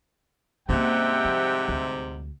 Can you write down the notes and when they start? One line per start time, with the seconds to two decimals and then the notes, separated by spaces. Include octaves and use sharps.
0.69 G#2 C3 G3 A#3 C#4 E5 F#5 G5
1.25 F3
1.68 D2